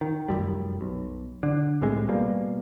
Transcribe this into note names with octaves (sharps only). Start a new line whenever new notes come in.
D#3
F1 C2 F#2 G3
B1
D3
C2 A2 C3 G#3
B2 G3 A#3